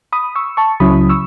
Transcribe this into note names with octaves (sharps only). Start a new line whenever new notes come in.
B5 D#6
C#6 E6
A5 C#6
C#2 C#3 F#3 C#4 E4 B5 D#6
C#6 E6